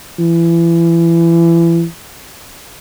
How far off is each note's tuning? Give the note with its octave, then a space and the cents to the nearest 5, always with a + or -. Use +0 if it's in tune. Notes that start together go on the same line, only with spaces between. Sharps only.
E3 +30